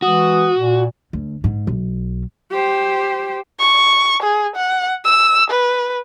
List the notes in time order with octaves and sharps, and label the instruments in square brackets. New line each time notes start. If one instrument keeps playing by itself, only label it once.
[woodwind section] E3 G#3 D#6 [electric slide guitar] F#4
[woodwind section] A#2
[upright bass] D2
G#2
B1
[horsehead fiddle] G4 C5
[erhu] C#6
G#4
F#5
E6
B4